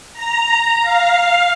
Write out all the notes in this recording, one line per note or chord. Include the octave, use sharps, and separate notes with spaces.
A#5
F5